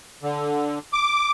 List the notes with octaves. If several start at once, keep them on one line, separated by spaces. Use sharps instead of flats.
D3
D6